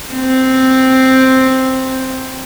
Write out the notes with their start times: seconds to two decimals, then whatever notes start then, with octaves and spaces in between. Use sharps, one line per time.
0.13 C4